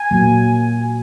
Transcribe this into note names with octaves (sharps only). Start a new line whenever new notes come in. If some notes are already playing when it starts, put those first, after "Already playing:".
Already playing: G#5
A#2 F#3 A#3